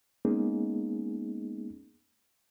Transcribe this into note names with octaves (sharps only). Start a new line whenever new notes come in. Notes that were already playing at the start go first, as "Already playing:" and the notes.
G#3 A#3 B3 C#4 D#4 G#4